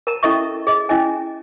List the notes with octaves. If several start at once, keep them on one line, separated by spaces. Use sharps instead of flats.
A#4 A5 A#5
C#4 E4 A4 D#5 E5 C#6
G#4 D#5
C#4 E4 D#5 G#5